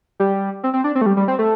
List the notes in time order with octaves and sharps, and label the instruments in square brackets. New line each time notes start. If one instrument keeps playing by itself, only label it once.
[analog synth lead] G3
C4
C4
D4
C4
A3
G3
G3
C4
A3